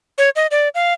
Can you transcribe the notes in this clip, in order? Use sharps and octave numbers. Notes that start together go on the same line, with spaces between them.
C#5
D#5
D5
F5